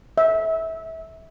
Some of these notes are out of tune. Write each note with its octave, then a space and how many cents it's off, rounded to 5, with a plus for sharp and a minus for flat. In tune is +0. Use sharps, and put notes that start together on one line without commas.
E5 -25